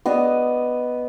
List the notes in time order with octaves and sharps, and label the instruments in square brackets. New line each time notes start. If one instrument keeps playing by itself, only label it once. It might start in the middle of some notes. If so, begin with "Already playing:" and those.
[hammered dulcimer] B3 D5 D#5